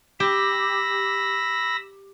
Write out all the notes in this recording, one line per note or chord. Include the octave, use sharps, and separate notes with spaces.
G4 B5 E6 A#6